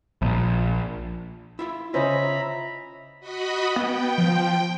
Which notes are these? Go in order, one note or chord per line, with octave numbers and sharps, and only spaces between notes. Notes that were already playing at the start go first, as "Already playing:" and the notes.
A#1
E4 F4 E5
C#3 C#4 F4 C5 D#5 E5 A#5 B5
F#4 D#5 B5
B3 G5
F3